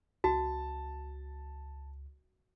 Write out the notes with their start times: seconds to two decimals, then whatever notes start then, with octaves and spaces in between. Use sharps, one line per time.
0.24 C#2 F#4 A5